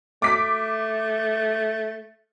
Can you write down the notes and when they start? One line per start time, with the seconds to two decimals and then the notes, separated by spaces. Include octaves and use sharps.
0.22 A3 D6 B6